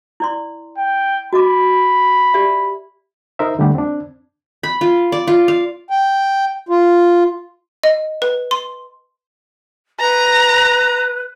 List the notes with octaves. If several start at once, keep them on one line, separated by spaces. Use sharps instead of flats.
E4 D5 C6
G5
F#4 D#5 B5 D6
G4 D5 E5
D#4 A#4 C5 E5
D3 G3 A3 G4 F#5
C4 D4
B5
F4
D5
F4
F5
G5
F4
D#5
B4
C6
B4 A#5